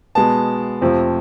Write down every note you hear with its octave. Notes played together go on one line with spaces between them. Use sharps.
B2 G#3 B3 A5
F2 C3 F3 A3 C4